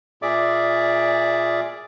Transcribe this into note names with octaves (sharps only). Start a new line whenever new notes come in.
A#2 G#4 D5 E5 D6